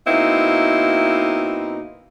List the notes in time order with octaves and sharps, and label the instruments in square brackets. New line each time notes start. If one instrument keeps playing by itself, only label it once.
[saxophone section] B2 A#3 C4 D#4 E4